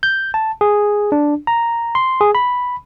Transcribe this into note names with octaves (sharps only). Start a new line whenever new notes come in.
G6
A5
G#4
D4
A#5
C6
G#4
B5